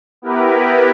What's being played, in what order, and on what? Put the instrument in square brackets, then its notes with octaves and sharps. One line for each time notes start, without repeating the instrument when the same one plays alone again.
[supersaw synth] B3 E4 G4 A#4 B4